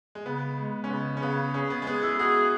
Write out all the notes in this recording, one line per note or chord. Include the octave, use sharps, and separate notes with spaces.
G#3
C#3 B3
G#3
C#4
C#3 B3
C#4
C#3 B3
C#4 G#4
B3
G#3
B3 G#4
E4
F#4 G#4